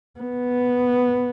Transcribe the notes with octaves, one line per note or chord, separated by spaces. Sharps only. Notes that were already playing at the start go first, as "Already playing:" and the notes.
B3